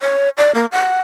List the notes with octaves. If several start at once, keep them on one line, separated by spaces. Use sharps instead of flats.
C#5
D5
A#3
F#5